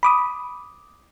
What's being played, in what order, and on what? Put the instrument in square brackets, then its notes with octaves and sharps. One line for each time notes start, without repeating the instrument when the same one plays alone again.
[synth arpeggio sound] B5 D6 D#6